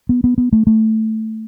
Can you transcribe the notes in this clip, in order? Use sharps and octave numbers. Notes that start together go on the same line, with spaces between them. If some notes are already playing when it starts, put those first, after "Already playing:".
B3
B3
B3
A3
A3